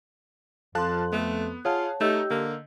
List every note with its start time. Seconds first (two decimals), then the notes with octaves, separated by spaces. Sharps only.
0.75 F2 F3 A4 F5 A5 C6 F#6
1.12 A3 B3
1.65 F4 G#4 C#5 F5 F#5 A5
2.01 A3 D#4 G4 C#5 D#5 E6 G6
2.30 D3 A#3